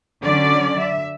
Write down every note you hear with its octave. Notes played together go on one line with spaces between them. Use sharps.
D3 F#3 C#4 D5
E5